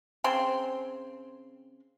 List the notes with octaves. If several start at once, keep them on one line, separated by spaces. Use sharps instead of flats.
C#3 C4 C6